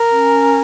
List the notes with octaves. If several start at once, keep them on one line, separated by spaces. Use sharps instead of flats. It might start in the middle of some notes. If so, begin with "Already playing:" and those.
Already playing: A#4
C#4